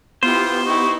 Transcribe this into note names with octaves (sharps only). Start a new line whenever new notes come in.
B3 E4 F4 G4 C5
D#4 E4 C#6